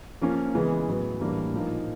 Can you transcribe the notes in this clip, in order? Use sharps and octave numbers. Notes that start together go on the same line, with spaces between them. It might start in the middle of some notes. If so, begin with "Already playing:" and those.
F3 A#3 C#4
C#3 E3 G#3 B3
A2 F#3 B3
A2 E3 G3 A#3 D4
A#2 F3 A#3 D#4